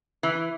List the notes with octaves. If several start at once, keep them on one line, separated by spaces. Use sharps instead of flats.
E3